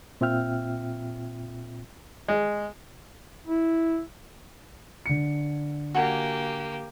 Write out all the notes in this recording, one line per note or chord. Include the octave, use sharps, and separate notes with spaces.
A#2 C4 F4 E5 G5 F6
G#3
E4
D3 C#7
A#3 F#4 G4 G#5